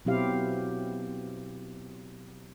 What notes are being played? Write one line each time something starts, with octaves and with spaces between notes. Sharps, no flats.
B2 F#3 C4 E4 G4 F5